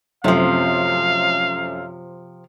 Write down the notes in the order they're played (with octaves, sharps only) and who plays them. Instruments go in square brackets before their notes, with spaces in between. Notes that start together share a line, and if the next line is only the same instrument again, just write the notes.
[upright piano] F#2 A3 C4 [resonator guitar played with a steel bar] C3 F3 [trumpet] F5